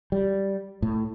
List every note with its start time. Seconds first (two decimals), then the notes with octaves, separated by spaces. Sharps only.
0.12 G3
0.82 A2